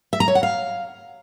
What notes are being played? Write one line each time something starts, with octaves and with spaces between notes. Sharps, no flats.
E5
A#5
C#5
F#5
F5